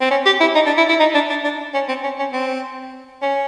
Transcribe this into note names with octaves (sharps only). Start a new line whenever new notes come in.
C4
C#4
G4
E4
D#4
D4
E4
E4
D#4
D4
D4
D4
C#4
C4
C#4
C#4
C4
C#4